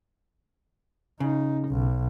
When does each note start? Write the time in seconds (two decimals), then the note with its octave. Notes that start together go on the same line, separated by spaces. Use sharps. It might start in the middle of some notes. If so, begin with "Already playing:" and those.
1.20 C#3 D#4
1.69 B1